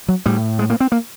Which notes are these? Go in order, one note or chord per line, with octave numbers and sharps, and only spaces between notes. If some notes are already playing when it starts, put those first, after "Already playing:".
F#3
A2 G3
G#3
A#3
C4
A#3